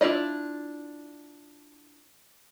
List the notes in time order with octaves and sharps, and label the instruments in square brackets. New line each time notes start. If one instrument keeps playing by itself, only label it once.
[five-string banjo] D4 E4 F4 D5 D#5